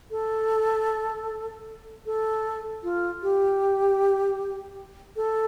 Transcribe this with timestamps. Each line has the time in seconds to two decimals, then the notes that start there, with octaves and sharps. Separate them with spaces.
0.11 A4
2.06 A4
2.83 F4
3.22 G4
5.16 A4